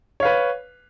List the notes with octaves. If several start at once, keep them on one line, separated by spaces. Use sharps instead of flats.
B4 C#5 F5